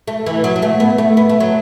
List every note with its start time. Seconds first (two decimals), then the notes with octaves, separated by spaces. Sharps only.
0.08 A3
0.26 E3
0.44 F#3
0.56 F#3
0.62 A3
0.80 B3
0.98 A3
1.17 B3
1.29 A3
1.40 F#3